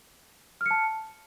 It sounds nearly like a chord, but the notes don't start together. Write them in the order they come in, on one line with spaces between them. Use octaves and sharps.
F6 C#7 A5